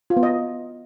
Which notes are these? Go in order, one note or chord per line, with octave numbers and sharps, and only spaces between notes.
F4
B3
D#5